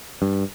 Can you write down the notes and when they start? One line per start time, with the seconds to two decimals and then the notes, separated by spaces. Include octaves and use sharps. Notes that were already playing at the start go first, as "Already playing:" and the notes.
0.22 G2